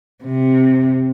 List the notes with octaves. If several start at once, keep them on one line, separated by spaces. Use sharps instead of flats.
C3